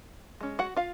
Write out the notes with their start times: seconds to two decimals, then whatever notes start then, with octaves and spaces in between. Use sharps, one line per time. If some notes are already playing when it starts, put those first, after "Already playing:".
0.41 G#3 C#4
0.59 F#4 F#5
0.76 F4 F5